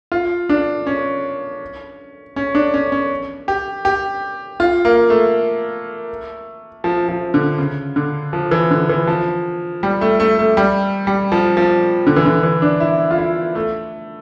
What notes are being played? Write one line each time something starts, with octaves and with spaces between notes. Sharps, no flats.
F4
D4
C#4
C#4
D4
C#4
C#4
G4
G4
F4
A#3
A3
F3
F3
D3
C#3
D3
F3
E3
D3
E3
F3
G3
A3
A3
A3
G3
G3
F3
F3
D3
E3
D3
E3
D4
E4
F4
E4
A3